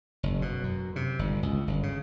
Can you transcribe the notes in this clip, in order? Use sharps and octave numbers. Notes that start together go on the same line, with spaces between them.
F#1
B2
F#2
C3
G1
C#2
G1
C#3